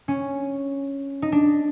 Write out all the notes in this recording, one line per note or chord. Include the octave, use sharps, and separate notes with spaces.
C#4
D#4
D4